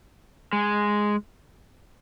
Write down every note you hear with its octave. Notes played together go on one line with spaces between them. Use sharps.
G#3